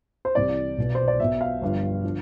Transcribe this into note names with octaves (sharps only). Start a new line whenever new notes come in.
C5
C2 C3 E3 D5
B1 B2
C5
D5
B1 B2 E5
F5
G1 G2 F3
D3 F3